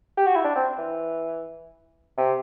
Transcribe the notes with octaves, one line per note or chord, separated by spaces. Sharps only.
G4
F#4
E4
D4
C4
E3
C3